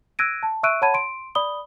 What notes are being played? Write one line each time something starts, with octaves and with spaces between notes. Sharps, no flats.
E6 F#6 G#6 A#6 D7 D#7
A5
E5 C#6 E6 F#6 D7 D#7
C#5 F#5 A5 B5 G#6 D#7
C6 D7
D5 B5 D#6 G7